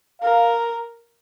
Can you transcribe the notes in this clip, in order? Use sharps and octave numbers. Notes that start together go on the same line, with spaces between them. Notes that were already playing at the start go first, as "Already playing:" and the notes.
A#4 F5